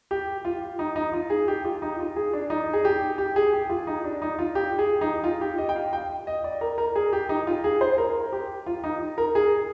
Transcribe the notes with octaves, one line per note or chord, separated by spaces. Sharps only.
G4
F4
D#4
D#4
F4
G#4
G4
F4
D#4
F4
G#4
D4
D#4
G#4
G4
G4
G#4
G4
F4
D#4
D4
D#4
F4
G4
G#4
D#4
F4
G4
D#5
G5
F5
G5
D#5
D5
A#4
A#4
G#4
G4
D#4
F4
G#4
C5
A#4
G4
F4
D#4
A#4
G#4